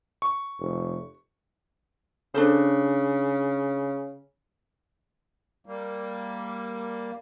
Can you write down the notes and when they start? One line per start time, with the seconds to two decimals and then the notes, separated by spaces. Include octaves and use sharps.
0.22 C#6
0.59 F1
2.35 C#3 D4 A4 C5
5.66 G3 A#3